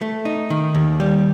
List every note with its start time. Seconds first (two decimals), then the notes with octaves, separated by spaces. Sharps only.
0.01 A3
0.25 D#4
0.50 D#3
0.74 D#2
1.00 G3